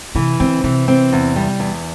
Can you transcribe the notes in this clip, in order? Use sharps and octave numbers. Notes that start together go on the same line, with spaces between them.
C3 E3
D3 C4
C3 E3
C4
E2
G3
E2